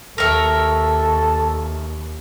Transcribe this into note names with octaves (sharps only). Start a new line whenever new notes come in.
D#2 A4 A#4 C#5 E5